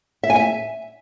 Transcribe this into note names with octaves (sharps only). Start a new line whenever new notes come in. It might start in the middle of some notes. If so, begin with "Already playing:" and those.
E5
G#5
E5